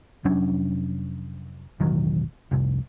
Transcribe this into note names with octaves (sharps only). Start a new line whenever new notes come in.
F1 F#3 C#4 D4
E1 A1 D#3 F#3
F1 C2